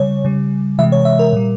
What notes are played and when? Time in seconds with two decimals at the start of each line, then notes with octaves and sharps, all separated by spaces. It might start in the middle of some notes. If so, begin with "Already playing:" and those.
Already playing: C#3 G3 C#5
0.25 C#3 G3
0.78 C3 E3 G#3 E5
0.92 C#5
1.05 E5
1.19 A#4
1.33 A#2 G3